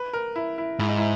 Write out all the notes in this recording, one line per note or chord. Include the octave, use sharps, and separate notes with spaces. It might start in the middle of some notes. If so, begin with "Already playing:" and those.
Already playing: B4
A#4
E4
E4
G#2 E4
D#4
E4